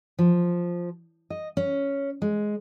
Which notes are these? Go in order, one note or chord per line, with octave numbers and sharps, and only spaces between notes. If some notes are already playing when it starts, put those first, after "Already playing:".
F3
D#5
C#4
G#3